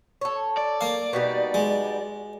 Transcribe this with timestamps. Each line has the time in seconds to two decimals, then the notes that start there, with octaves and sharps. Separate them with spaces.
0.21 A4 C#5
0.57 D5
0.81 A#3 F5
1.13 B2 G3 D#4
1.54 G#3